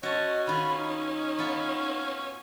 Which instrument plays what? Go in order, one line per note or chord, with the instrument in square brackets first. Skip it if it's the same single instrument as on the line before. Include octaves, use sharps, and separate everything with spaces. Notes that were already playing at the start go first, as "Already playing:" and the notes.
[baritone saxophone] C#4 [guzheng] F#4 A5 [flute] D#5
[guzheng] D#3 F4 [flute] B5
[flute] D#4
[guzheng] B3 F4